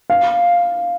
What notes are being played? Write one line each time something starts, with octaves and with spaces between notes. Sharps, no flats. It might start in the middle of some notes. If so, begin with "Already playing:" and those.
F5